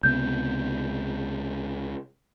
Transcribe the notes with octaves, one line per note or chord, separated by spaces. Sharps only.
C#2 C3 B3 G6